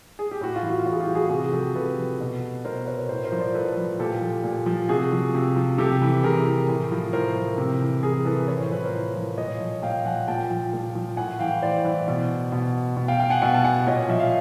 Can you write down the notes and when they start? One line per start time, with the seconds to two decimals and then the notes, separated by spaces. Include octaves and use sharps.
0.19 G#4
0.31 G4
0.41 A2 F#4
0.56 F4
0.63 E3
0.70 F#4
0.79 F4
0.86 A2 F#4
0.92 G#4
1.00 F4 G4
1.08 E3
1.15 F#4 G#4
1.29 C3 F#4 G#4
1.52 F3 G4 A4
1.75 C3 A4 B4
1.98 F3
2.20 B2
2.65 B2 A#4 C5
2.87 B4 C#5
3.09 A2 A#4 C5
3.24 A#4 C5
3.32 F3
3.39 C5 D5
3.54 A2 A4 B4
3.77 F3
3.99 A#2 G4 A4
4.21 F3
4.44 A#2
4.66 F3
4.89 C3 F#4 G#4
5.12 F3
5.35 C3
5.56 F3
5.78 C3 G4 A4
6.01 E3
6.23 C3 G#4 A#4
6.46 E3
6.68 A2
6.91 F3
7.13 A2 A#4 C5
7.36 F3
7.58 C3
7.81 E3
8.03 C3 G#4 A#4
8.25 E3 A4 B4
8.48 A2 C#5
8.60 C5
8.71 F3 B4
8.83 A#4 C5
8.94 A2
9.16 F3
9.37 A#2 C#5 D#5
9.60 F3
9.82 A#2 F5 G5
10.05 F3 F#5 G#5
10.28 A#2 G5 A5
10.50 F3
10.73 A#2
10.95 F3
11.17 A2 F#5 G#5
11.39 E3 F5 G5
11.62 A2 C5 D5
11.84 E3
12.08 B2
12.52 B2
12.97 B2
13.08 F5 G5
13.19 F5 G5
13.30 F#5 G#5
13.42 B2 F#5 G#5
13.54 A5
13.64 F#5 G#5
13.87 A#2 C#5 D#5
14.09 F3 E5
14.20 F5